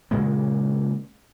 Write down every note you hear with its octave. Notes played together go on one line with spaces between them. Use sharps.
A#2 C#3 G#3 A#3